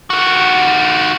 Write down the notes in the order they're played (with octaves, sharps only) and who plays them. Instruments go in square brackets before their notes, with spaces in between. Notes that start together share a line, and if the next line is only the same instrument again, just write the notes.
[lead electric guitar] D#3 F#4